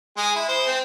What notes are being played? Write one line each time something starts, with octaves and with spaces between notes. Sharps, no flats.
G#3 G#4
E4
C5
C4